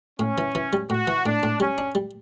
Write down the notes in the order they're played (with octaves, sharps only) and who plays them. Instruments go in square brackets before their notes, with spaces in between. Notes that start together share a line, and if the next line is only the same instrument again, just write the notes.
[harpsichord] A2 [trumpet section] C#4
[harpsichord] E3
E3
G3
[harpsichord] A2 [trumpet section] F#4
[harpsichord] E3
[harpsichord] A2 [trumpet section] D4
[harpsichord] A2
[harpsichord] G3 [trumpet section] C#4
[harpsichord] D4
G3